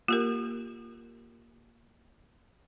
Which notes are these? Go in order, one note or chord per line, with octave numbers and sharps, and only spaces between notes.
A#3 F4 G4 A#4